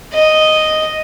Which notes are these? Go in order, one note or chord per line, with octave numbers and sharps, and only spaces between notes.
D#5